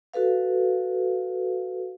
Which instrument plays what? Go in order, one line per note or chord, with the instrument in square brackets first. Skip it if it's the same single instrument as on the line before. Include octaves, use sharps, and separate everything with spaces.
[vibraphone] F#4 A4 B4 F5